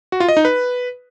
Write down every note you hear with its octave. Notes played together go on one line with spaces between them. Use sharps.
F#4
F4
D#5
D#4
B4